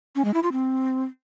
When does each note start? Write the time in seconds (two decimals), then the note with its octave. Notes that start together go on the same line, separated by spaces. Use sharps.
0.15 C#4
0.25 G#3
0.34 E4
0.43 F4
0.52 C4